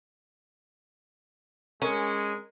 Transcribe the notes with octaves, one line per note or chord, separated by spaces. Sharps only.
G#3 C#4 A#4